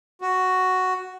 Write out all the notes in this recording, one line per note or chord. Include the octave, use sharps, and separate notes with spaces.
F#4